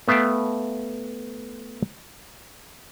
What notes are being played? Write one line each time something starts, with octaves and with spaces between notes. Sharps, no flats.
A3 B3 E5 F5 G5